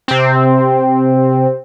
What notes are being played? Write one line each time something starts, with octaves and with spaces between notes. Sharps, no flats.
C3 C4